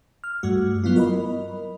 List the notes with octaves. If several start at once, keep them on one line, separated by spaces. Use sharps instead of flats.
F6
G2 G3 A3 F#4
F#3 B3 E4 F4
A#4 D#5 B5